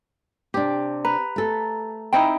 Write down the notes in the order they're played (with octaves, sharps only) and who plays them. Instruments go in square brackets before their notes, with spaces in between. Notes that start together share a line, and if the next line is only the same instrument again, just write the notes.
[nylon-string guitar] C3 D4 [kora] G4
[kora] B4 [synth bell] A#5
[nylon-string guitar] A3 A4
[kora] C4 D#4 E4 [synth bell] G5